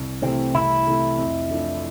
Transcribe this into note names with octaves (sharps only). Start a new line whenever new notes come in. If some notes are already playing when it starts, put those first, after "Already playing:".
Already playing: C2
C3 E3 A3 C4
C2 E4
C3 E3 A3
F2
E3 A3 D4 F4